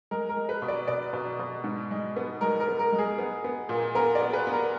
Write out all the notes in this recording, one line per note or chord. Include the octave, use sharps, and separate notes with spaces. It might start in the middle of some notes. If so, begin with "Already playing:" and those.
G#3 A#4
A#4
G#3
B4
B2
D5
B2 D5
B2
B2
G#2
G#3
B3
G#3 A#4
A#4
B3
A#4
G#3
G#4
B3
B3
A#2
B3 A#4
D5
B3
B4
B3
A#4